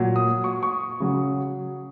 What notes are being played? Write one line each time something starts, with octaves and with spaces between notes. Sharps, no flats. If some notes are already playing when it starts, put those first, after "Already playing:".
Already playing: A#2 F#3
D#6
C#6
C#6
C#3 F#3